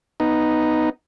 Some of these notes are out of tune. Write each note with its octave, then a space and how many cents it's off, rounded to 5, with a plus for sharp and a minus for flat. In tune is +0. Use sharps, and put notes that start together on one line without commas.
B3 +0 D#4 +0